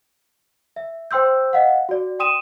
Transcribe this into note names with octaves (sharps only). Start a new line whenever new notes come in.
E5
C5 G5 C6 E6 G6
D#5 F5 F#5
F#4 D5
G5 C6 D#6 D#7 E7